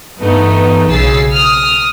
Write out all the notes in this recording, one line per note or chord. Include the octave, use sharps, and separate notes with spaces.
G2 E3 A3 B3 D#4
B1 C#3 G#4 E6 A6 C7
D#6 F6